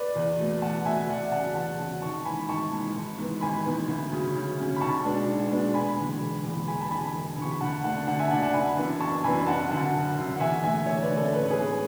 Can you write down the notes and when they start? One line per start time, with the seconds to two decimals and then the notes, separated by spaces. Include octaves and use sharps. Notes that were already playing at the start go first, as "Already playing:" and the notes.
Already playing: B4 D5
0.15 E2
0.38 B2 A3
0.62 E2 F#5 A5
0.85 B2 A3 E5 G#5
1.09 E2 D5 F#5
1.31 C#3 F#3 F#5 A5
1.55 E2 F#5 A5
1.79 C#3 F#3
2.02 G#1 A5 C#6
2.25 G#2 E3 G#5 B5
2.48 G#1 A5 C#6
2.71 G#2 E3
2.95 G#1
3.18 G#2 E3 B3
3.41 G#1 G#5 B5
3.65 G#2 E3 B3
3.88 D2
4.12 C#3 F#3 C#4
4.35 D2
4.59 C#3 F#3 C#4
4.76 B5
4.81 B1 A5 C#6
5.05 B2 G#3 B3 D4
5.28 B1
5.51 B2 G#3 B3 D4
5.74 E1 G#5 B5
5.97 E2 D3 G#3
6.20 E1
6.45 E2 D3 G#3
6.67 E1 G#5 B5
6.81 A5
6.90 E2 D3 G#5 B5
7.14 E1
7.37 E2 D3 C#6
7.51 B5
7.60 D2 F#5 A5
7.84 D3 A3 D4 F#5 A5
8.07 D2 F#5 A5
8.19 E5 G#5
8.31 D3 A3 D4 D5 F#5
8.43 F#5 A5
8.53 F#1 G#5 B5
8.77 F#2 E3 B3 D4
9.00 F#1 A5 C#6
9.24 F#2 E3 B3 D4 G#5 B5
9.46 F#1 F#5 A5
9.70 F#2 D3 F#5 A5
9.94 F#1
10.17 F#2 D3
10.36 F#5
10.40 E2 E5 G#5
10.63 D3 A3 E5 G#5
10.86 E2 C#5 E5
11.02 B4 D5
11.10 D3 A3
11.17 A4 C#5
11.34 A1 B4
11.43 C#5
11.50 G#4 B4
11.56 G#2 G#3 B3